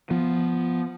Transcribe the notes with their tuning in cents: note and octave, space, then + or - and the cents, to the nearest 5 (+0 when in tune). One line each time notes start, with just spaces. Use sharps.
F3 -5 B3 +0